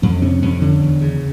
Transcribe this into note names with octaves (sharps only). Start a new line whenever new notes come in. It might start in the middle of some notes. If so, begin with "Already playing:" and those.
F2 C#4
C3 C#4
F2 C#4
D3 C#4
E2
C#3